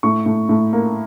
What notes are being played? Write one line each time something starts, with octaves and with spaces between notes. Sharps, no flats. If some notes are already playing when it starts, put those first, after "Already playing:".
A2 C#6
A2
A2
A#3